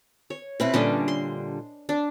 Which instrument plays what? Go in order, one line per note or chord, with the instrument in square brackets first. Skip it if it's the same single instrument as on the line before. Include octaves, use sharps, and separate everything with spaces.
[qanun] C#5
[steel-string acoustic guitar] B2 C4 E4 [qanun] B4
[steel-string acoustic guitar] A#2 D3 G3 [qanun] C#4 D4 D#5
[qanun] C6
D4